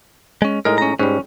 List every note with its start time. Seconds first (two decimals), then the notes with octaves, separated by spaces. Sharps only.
0.42 G#3 C#4
0.65 A2 G#3 D#4 A#4
0.78 C#4 A#5
0.99 G#2 G3 C#4